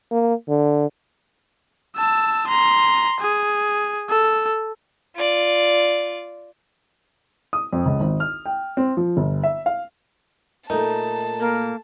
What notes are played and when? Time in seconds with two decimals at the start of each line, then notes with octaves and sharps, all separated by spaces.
0.11 A#3
0.48 D3
1.96 A5 E6
2.48 A#5 C6
3.20 G#4
4.09 A4
5.16 F4 D5
7.53 D#6
7.73 F2
7.86 C#2
8.00 G#1
8.20 F6
8.46 G5
8.77 C4
8.97 F3
9.17 G1
9.43 E5
9.66 F5
10.70 A#2 A3 D#4 A5
11.40 A#3